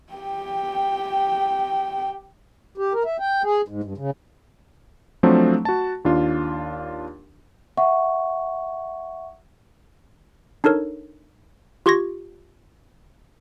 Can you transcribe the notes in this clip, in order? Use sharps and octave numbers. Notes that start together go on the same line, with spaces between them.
G4 G5
G4
A#4
E5
G5
G#4
G#2
G2
C#3
F3 F#3 A3 C4 D4
F#4 A5
D#2 D4 F4
E5 F#5 C#6
D4 D#4 A4 A#4 C#5
F4 G4 C6 C#6 G#6 A#6